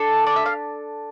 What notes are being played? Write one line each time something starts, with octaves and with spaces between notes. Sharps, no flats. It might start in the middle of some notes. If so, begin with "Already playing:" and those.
Already playing: D4 A4
D5
E5
F5